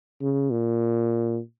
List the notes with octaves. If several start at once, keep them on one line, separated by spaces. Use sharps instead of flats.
C#3
A#2